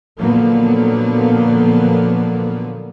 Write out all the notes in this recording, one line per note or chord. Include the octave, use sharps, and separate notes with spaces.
A#2 D3 F3 F#3 A#3 B3